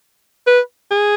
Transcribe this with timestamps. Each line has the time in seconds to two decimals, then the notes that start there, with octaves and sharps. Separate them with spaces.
0.47 B4
0.91 G#4